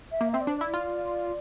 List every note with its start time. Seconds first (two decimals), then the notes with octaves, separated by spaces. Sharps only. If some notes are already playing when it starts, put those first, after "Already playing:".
0.11 E5
0.21 A#3
0.32 C4 E5
0.41 D5
0.47 D4 C5
0.56 E4 D5
0.74 F4